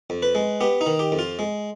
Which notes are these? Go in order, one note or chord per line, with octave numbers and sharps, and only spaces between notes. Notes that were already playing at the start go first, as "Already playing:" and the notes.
F2
B4
G#3
B3 G4
D#4
D#3
G4
F2
F4
G#3